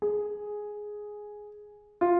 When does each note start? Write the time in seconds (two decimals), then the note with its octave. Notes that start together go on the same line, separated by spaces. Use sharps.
0.02 G#4
2.01 F4